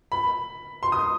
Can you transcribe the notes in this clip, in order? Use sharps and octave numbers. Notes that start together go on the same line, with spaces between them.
B5
C6
D#6